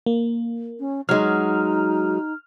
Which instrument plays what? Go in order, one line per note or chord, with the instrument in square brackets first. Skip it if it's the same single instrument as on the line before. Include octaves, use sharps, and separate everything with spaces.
[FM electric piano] A#3
[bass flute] C#4
[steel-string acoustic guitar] F#3 G#3 [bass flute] D#4 [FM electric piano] F6